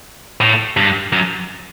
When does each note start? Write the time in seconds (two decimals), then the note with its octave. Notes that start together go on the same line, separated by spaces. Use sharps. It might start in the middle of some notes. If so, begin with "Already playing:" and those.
0.41 A2
0.77 G2
1.13 F#2